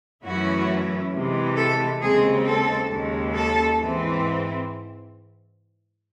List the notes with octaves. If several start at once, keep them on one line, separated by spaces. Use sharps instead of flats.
F#2 E3 A3 C#4 E4 F#4
C3 E3 G#3
A4
D#2 C#3 G#3 C4 G#4
A4
D#2 C#3 G#3
A4
G#2 E3 C4